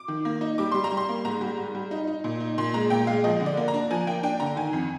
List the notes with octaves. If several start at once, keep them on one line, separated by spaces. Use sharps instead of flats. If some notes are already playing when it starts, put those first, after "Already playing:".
Already playing: D6
D#3
A#3
D#4
G3 D6
G3 C6
A#5
G3
C6
A#3
G#2 A#5
G3
G#2
G3
D#4
D#4
A#2
D#4
A#2 C6
G#3 A#5
A#2 G5
G#3 F5
F3 D#5
D3
D5
A#3
A#5
D4
F3 G#5
A#3 G5
D4 G5
D3 A#5
D#3 G#5
F2